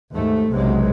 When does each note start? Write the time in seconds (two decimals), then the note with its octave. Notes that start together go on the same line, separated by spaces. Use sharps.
0.13 D#2 G#2 A3
0.52 F#1 B1 C3 F#3 G#3